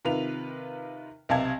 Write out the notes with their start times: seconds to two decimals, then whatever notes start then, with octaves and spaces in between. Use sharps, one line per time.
0.05 C3 D#3 F4 B4 F7
1.29 B1 C3 F5 A5 G#6